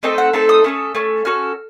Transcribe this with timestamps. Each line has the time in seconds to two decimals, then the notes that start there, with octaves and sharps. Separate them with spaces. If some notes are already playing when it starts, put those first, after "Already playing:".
0.03 A3 C4 D#4 A4 D#5
0.18 F#5
0.33 A3 C4 D#4 A4 A5
0.49 D#6
0.64 A3 C#4 A4
0.95 A3 C#4 A4
1.25 C#4 F#4 A4 F6